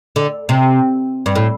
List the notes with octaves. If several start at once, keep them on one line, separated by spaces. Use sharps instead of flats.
D3
C3
G2
A2